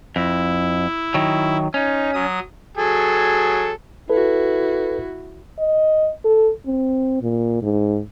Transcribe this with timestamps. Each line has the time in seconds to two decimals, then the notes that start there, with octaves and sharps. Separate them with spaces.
0.16 F2 E4
1.14 D#3 F#3
1.74 C#4 D#4
2.14 F#3 D#6
2.77 F#3 G#4 A4
4.10 E4 F#4 A4 B4
5.59 D#5
6.25 A4
6.67 C4
7.22 A#2
7.62 G#2